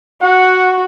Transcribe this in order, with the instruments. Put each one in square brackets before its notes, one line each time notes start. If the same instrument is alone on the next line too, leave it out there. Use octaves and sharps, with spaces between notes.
[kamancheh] F#4 [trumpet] F#5